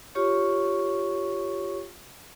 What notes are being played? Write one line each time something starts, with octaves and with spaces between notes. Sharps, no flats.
F4 G4 C#5 C#6